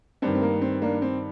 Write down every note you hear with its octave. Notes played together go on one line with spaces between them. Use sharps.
G2 D#3 C4
C4
A#3
C4
A#3 D4
C4